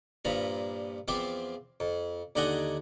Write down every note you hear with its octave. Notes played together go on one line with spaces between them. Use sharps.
G2 A#2 F3 A#5 B5
E2 F3 C4 E5 C6 D6
F2
D#2 D3 D5 D#5 F#5 G#5